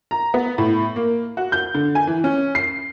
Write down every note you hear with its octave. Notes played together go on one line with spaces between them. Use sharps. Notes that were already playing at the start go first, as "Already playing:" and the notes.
A#5
B3
A2
A#3
F#4
G6
D3
G#5
E3
C#4
C7